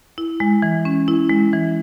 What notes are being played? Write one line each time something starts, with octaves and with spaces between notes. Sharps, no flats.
E4
G#3
E3
C#4
E4
G#3
E3